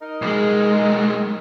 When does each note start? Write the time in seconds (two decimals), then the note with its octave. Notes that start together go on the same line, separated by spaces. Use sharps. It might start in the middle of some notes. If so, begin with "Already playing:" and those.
0.02 D#4 A#4 D#5
0.22 B1 G#3